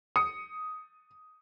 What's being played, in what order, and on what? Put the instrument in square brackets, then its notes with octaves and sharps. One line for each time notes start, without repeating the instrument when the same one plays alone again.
[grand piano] D#6 C#7